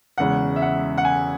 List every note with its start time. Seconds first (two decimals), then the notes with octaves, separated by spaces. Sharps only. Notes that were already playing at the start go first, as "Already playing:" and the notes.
0.18 E1 E2 C#3 G#3 F#5
0.56 E5
0.62 F#5
0.98 F#5
1.05 G#5